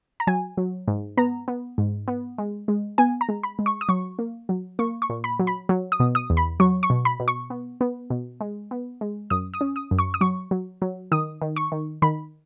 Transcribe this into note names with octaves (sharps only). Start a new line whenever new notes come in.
A#5
F#3 G#5
F#3
G#2
B3 A#5
B3
G#2
B3
G#3
G#3
B3 G#5
A#5
G#3
B5
G#3
C#6
D#6
F#3 C#6
A#3
F#3
A#3 C#6
C#6
A#2
B5
F#3
B5
F#3
D#6
B2
D#6
E2
B5
F#3 C#6
C#6
B2
B5
B2
C#6
B3
B3
B2
G#3
B3
G#3
F#2 D#6
D#6
C#4
D#6
F#2
C#6
D#6
F#3 C#6
F#3
F#3
D#3 D#6
D#3
C#6
D#3
D#3 B5